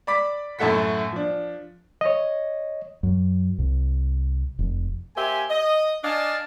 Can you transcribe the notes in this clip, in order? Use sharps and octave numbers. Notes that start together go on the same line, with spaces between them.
D5 B5 D6 B6
F#2 A2 A3 A4 F#5 B6
F3 D4
C#5 D#5
F#2
C2
F1
A#3 G4 C5 E5 G#5
D#5
D4 D5 D#5 F5 G#5 A5